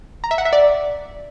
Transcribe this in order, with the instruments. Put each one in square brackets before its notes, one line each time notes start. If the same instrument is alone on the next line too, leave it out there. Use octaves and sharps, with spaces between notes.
[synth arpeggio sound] A#5
E5
F#5
E5
D5